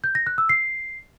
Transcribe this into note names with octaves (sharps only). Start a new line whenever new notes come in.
G6
A#6
F#6
E6
C7